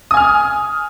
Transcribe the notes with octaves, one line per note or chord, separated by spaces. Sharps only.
G#5 D#6 F6